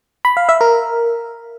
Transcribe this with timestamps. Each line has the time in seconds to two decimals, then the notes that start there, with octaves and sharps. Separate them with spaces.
0.25 B5
0.37 F5
0.49 E5
0.61 A#4